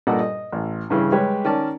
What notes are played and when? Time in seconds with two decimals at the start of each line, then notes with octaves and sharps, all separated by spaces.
0.07 G2 A#2 A4 D5 D#5 F#5
0.20 D#5
0.52 A1
0.90 G2 C#3 E3
1.12 G3 G#3 G4 B4 C#5
1.44 D#3 C#4 A#4 D5 A5